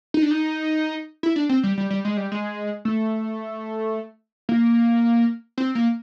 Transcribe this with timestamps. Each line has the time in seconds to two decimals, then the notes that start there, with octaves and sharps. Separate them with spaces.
0.14 D#4
0.22 D4
0.31 D#4
1.23 E4
1.36 D4
1.49 C4
1.63 G3
1.77 G3
1.90 G3
2.05 G#3
2.17 G3
2.32 G#3
2.85 A3
4.49 A#3
5.58 C4
5.75 A#3